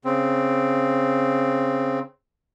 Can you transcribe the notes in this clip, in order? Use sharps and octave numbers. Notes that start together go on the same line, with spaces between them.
C#3 C4